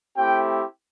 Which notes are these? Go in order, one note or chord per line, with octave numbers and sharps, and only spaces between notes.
A3 C4 E4 G4 G5